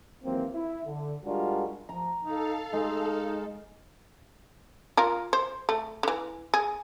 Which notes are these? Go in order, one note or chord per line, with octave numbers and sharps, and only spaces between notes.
D#2 E3 F#3 A#3 C4
E4
D3
G3 G#3 D4 F4 F#4 A#4
F3 A#5
D#4 A4 F5
G#3 D#4
F4 A#4
C5
A3
D3 E3
G#4